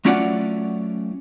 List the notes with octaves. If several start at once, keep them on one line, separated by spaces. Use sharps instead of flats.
F#3 A3 C#4 F4 D5 F#5